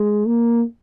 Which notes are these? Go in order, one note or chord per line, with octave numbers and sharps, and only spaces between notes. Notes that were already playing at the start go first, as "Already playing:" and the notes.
Already playing: G#3
A#3